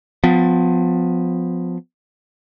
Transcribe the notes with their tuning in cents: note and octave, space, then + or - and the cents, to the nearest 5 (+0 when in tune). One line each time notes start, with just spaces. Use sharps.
F3 +25 B3 +35